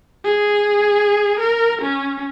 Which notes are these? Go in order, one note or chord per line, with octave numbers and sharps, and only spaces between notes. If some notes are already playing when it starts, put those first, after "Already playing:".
G#4
A#4
C#4